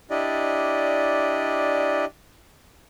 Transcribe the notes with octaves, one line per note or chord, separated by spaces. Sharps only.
D4 E4 G4 D5 D#5